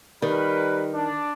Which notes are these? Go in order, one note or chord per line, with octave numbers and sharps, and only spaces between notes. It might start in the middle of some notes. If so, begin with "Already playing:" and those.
D#3 G3 A#4 B4
D4